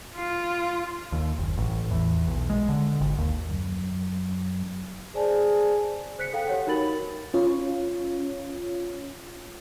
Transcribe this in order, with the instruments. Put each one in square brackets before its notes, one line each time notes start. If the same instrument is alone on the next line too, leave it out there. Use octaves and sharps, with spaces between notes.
[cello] F4
[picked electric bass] D#2
F#1
A1
E2
B1
G#3
D3
G#1
D#2
[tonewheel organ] F#2
[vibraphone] G#4 C5 D5 G#5 A5
[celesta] C5 F#6 B6 C#7
A4 F5 G5
G4 C#5 F#5
D#4 F#4 A#4 B5 A6 F#7
[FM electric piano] C#4 F4 C#5